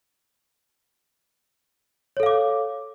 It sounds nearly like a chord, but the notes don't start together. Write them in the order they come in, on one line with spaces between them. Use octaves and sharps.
C#5 A4 F5 D6